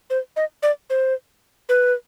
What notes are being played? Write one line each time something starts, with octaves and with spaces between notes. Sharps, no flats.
C5
D#5
D5
C5
B4